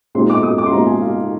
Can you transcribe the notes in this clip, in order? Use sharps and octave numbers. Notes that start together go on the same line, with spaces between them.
A#2 G#3 C4 D#4 C6
D6
D#6
D6
C6
A#2 G#3 C4 D#4 A#5
G#5
F5